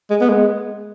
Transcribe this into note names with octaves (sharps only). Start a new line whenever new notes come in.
G#3
B3
G#3